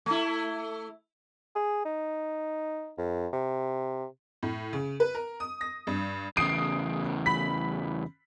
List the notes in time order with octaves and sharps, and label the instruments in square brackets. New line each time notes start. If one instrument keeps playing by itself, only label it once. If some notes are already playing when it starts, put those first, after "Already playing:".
[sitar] A3 E4
[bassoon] G#4
D#4
F2
C3
[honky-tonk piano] A2
C#3
B4
A#4
D#6
A#6
G2
[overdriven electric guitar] E2 C#3 [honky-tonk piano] D#6 C7 D7
[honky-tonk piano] B5 B6